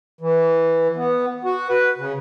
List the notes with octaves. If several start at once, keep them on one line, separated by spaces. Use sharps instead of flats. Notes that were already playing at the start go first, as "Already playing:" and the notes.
E3
B3
F#4
B4
C#3